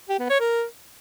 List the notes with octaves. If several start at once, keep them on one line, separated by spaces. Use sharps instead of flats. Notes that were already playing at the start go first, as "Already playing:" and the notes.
G4
B3
C#5
A#4